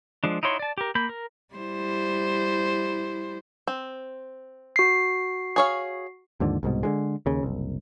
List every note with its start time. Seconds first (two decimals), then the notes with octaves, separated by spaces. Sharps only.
0.24 F3 G#3 D4
0.43 D#4 E4 F#4 C#5 C6
0.59 D5 A5
0.78 G4 A#4
0.95 A#3 B5 G6
1.09 A#4
1.55 G3 E4 C5
3.67 C4
4.76 F#4 C7
5.56 G#4 C#5 F5
6.40 D#2 G#2 D3 F3
6.63 C2 G#2 B2
6.83 D3 E3 G#3
7.26 D#2 C#3
7.43 F#1 C2